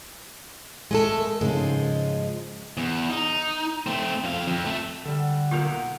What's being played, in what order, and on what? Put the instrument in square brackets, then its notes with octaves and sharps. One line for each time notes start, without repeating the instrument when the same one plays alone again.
[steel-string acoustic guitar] G#3 A3 A4
[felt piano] A#4
[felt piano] G#2 C#3 [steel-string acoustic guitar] F3 G#3
[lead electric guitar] E2
D#4
A3 C4
F2 F5
F2
A3 A4
[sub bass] D3 [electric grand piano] G3 A4 [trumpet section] F#5
[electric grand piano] B1 A#3 G6 [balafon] F4 A#4